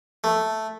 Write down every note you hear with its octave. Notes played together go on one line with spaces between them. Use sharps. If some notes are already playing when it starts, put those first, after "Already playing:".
A3